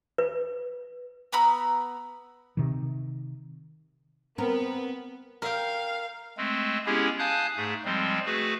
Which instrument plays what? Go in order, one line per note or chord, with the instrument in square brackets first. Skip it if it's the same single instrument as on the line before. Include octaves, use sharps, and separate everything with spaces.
[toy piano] B4
[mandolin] B3 A#5 B5 E6
[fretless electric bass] C3 D#3
[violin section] B3 [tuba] C4 [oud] A#4
[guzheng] A#4 G5 [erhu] F5
[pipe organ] G#3 A3 C4
G#3 B3 C#4 E4 G4 G#4
F5 G#5 A5 D#6 F#6 G6
G#2 A3 G#4
F3 G3 G#3 C4
A3 F#4 G#4 B4